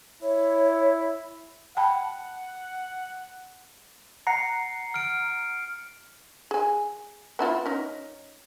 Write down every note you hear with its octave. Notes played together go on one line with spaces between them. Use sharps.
E4 C#5
F#5 G5 A5 B5
F#5 A#5 C7 C#7
F6 D7
G#4 G#5
B3 E4 F4
C#4 D#4